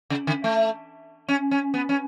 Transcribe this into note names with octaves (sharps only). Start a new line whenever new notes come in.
C#3
D3
A3
C#4
C#4
B3
C#4